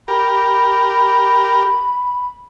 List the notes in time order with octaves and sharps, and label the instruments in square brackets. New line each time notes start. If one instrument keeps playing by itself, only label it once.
[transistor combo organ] G4 A#4 [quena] B5